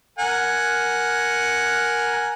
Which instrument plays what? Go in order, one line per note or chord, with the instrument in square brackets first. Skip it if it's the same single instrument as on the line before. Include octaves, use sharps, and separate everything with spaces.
[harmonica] A#4 F#5 G#5